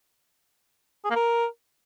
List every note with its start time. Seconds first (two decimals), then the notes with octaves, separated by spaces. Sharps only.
1.05 G#4
1.10 A#3
1.16 A#4